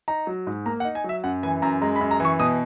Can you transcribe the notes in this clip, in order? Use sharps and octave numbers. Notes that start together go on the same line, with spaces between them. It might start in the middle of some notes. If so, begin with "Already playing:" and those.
D#4 A#5
F#3
G#2
A#3 A#5
F#5
D#4
G#5
F#3 E5
F#2 F#5
E3 G#5
F#2 A#5
G#3 A#5
B5
F#2
A#5
E3 C#6
B2 D#6